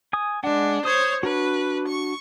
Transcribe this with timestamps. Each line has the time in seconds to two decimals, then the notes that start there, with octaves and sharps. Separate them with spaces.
0.13 G#5 D#6
0.44 G#3 D4 F#5
0.85 C5 C#5 D#6
1.23 D4 F#4 B4
1.87 C#6